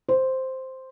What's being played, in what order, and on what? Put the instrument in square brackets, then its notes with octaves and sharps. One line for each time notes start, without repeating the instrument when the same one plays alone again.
[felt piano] C5